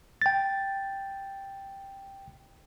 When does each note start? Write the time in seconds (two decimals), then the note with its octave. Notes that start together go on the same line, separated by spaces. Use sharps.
0.22 G5 A6